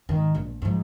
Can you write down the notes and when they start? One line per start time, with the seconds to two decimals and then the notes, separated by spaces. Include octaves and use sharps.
0.09 G#2 D#3
0.35 A#1
0.62 G#2 F3